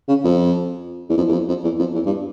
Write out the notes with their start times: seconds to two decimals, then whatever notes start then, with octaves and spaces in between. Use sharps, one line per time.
0.09 C#3
0.24 F2
1.10 E2
1.17 F2
1.27 E2
1.32 F2
1.48 F2
1.64 E2
1.79 F2
1.95 E2
2.06 G2